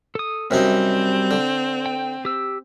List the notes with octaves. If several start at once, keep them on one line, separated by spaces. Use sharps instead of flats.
A4 D#6
F#2 C3 G3 C4 D#4
D3
G5
G4 E6